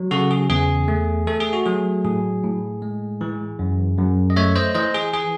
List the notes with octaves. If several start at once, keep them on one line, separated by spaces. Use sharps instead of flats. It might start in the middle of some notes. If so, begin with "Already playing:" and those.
Already playing: F#3
C#3 F#4 A4
G#4
E2 G#4
A3
A3 A4
G#4
F#4
F#3 G#4
A2 G#4
A2
G#3
E3
F#2
F#2
D#5
A3 C#5 E5
C5 D#5
E3 C5 D#5
G#4
G#4